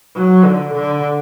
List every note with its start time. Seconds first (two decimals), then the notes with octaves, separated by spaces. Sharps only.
0.16 F#3
0.45 D3
0.73 D3